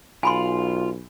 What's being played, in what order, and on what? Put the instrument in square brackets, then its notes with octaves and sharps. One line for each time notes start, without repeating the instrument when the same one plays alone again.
[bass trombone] B1 [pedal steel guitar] F4 [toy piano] G#5 B5 C6